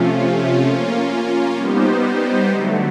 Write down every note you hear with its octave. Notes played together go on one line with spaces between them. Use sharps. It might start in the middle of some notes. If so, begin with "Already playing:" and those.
Already playing: C3 F3 A3 C#4 F4
A#3 C#4 F4
G3 B3 D#4 G4 C5
D3 F#3 A3